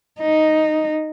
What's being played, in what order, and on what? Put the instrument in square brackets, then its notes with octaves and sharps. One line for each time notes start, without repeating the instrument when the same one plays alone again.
[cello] D#4